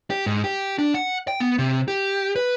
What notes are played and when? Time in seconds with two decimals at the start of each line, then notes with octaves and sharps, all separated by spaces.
0.10 G4
0.26 G#2
0.44 G4
0.79 D4
0.94 F#5
1.28 G5
1.40 B3
1.59 C3
1.88 G4
2.36 B4